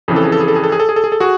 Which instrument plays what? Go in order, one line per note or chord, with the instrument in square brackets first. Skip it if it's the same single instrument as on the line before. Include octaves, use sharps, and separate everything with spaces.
[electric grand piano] F2 C#3 E3 G#4
A4
G#4
A4
G#4
A4
G#4
A4
G#4
A4
G#4
A4
G#4
A4
F#4 G#4